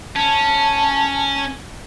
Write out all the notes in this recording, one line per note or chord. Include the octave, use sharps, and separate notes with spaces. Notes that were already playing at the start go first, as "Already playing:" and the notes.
C#4 A5